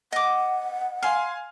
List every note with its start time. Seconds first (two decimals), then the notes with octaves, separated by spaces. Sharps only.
0.12 D#5 F#5 D6
1.03 F5 G#5 C6 F6